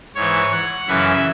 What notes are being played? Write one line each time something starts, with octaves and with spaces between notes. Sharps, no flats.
G#2 E3 C#5
F#5
F#2 C#3 E3 E5